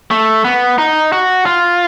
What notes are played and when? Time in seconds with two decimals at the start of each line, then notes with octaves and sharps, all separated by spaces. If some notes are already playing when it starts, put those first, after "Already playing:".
0.11 A3
0.44 B3
0.78 D#4
1.13 F#4
1.46 F4